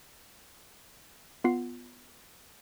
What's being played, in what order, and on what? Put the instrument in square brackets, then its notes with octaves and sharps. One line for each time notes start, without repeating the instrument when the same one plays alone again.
[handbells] B3 F4 F#5 C7